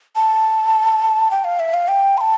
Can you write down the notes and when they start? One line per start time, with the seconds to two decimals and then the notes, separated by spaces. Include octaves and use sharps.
0.16 A5
1.31 G5
1.44 F5
1.60 E5
1.74 F5
1.88 G5
2.18 C6
2.21 A5